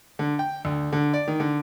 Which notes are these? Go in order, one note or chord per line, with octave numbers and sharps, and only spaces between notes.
D3
G5
D2
D3
D5
D#3
D3